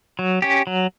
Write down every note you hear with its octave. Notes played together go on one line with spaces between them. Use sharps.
F#3
C#4 G4
F#3